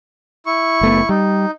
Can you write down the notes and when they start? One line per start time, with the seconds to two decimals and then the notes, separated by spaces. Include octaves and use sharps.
0.46 E4 C#6
0.81 F#1 A3 B3
1.09 G3 D#4